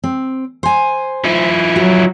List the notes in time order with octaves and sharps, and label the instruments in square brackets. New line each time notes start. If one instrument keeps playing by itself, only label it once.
[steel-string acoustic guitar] C4
C5 G#5
[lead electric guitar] F3 E4
[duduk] F#3 [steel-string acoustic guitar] F#4